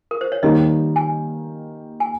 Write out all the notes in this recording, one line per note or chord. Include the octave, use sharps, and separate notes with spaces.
A#4
C5
C#5
D#3 G3 A#3 D#4 A#4 D#5
G#5
G#5